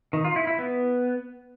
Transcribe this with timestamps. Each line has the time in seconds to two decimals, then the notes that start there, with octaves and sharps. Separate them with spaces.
0.13 D#3
0.25 F4
0.36 E4
0.47 E4
0.59 B3